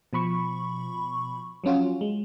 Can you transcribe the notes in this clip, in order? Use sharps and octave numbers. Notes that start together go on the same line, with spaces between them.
B2 F3 B5 C#6
F3 F#3 C#4 F4 F#4
G#3